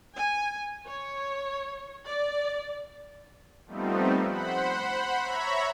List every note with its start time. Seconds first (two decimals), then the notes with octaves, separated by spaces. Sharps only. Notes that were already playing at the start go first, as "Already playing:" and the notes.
0.16 G#5
0.85 C#5
2.08 D5
3.67 F3 G3 A3 B3 C4 D#4
4.27 C5 F#5 B5
5.19 C#5 E5 A#5 B5 C#6